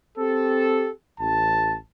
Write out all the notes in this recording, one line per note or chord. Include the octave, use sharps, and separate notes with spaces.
C4 G4 A4
A1 A5